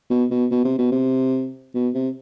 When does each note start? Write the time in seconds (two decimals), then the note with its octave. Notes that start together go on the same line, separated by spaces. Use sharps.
0.10 B2
0.31 B2
0.51 B2
0.65 C3
0.79 B2
0.92 C3
1.75 B2
1.95 C3